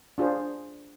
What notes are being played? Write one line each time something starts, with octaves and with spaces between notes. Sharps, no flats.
D4 F4 G#4 C5